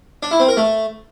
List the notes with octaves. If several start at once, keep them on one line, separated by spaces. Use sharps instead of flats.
D4
E4
C4
A#4
A3